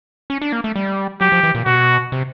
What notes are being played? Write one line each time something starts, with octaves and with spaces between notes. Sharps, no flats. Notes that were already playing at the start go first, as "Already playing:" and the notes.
C#4
D4
A#3
A3
G3
F#3 G4
F3
E3
A#2
B2 F#4
C3